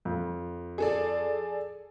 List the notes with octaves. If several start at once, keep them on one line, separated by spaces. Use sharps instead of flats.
F2
G#4 A4 D5